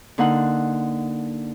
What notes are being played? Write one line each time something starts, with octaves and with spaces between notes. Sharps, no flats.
D3 A#3 D#4 F#5 C6 F#6